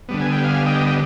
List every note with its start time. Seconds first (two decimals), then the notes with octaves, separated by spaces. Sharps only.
0.09 D3 G3 B3
0.21 G#5
0.33 G5
0.44 F5 G#5
0.66 D#5 G5
0.87 G5